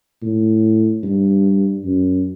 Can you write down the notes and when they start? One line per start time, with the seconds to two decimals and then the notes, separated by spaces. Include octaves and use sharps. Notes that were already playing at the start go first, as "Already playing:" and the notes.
0.23 A2
1.03 G2
1.85 F#2